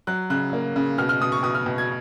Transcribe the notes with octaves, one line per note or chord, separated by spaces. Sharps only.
F#3 F#6
C#3 F#6
A#3
C#3
B2 F6
F6
B2 D#6
C#6
B2 D#6
F6
B2
G#6